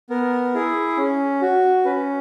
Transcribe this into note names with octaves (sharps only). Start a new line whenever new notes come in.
B3 A#4
E4 G#4
C#4
F#4
C#4 B4